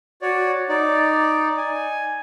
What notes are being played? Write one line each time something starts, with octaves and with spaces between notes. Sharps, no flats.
F#4 C#5 D5
D#4 D5
G#5